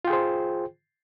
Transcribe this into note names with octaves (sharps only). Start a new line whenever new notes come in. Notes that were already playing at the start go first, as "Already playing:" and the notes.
F4 G#4 C5 G5